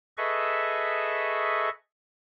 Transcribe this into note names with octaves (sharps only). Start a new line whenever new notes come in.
G#4 A4 B4 D#5 E5 C#6